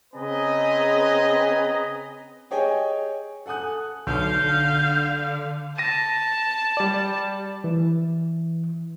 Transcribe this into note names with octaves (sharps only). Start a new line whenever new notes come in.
C#3 C4 B4 D#5 G#5 A#5
G4 G#4 C#5 D#5 G5 G#5
A4 F#5 G#5 D#6 F#6
B1 D3 F5 G6
A5 A#6 D#7
G3 D5
E3